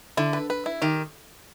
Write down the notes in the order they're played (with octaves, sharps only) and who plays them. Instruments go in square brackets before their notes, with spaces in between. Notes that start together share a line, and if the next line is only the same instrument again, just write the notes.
[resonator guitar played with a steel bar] D3 [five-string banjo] E4
[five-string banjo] B4
B4
E4
[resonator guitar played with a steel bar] D#3 [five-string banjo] G4